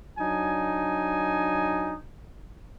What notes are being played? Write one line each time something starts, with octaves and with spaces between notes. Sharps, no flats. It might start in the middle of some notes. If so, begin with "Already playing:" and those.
F#3 D4 D#4 G#5